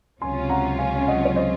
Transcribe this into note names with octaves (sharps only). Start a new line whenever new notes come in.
C#2 C3 F#3 C#4 F4 G#5 C6
F#5 A#5
F5 G#5
G#5
D#5 F#5
C#5
C5 D#5